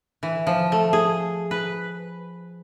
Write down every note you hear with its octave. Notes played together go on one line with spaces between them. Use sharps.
E3
F3
A3
G#4
B4